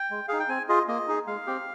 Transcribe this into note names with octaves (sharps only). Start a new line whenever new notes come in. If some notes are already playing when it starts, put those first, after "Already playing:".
Already playing: G5
G#3
D#4 G#4 F5
G5
C4 G#5
F4 G#4 D#5
A#3 D#5
D#4 G#4
G#3 F5
C4 G4